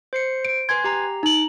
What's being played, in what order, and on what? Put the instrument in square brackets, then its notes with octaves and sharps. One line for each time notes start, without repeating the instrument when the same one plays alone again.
[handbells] C5 C7 C#7
[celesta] D7
[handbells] B4 G#5 C6 [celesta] G#6
[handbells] G4 A#5
[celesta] D#4 F#7 [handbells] A#5